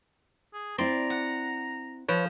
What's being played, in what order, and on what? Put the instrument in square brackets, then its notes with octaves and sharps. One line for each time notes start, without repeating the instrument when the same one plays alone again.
[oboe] G#4
[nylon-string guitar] C4 E4 [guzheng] D5 C6 [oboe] A#5
[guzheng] F#5
[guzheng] F3 [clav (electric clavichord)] B4 C#5